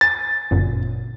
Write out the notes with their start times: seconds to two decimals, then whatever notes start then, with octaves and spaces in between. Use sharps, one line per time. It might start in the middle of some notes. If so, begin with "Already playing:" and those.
0.01 G#5 A6
0.51 G1 F#2 A#2